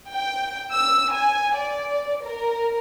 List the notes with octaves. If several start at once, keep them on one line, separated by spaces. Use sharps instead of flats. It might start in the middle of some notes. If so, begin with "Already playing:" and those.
G5
E6
G#5
D5
A#4